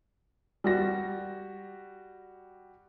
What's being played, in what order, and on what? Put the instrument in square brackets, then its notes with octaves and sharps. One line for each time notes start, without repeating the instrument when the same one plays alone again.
[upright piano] G3 F#4 A#6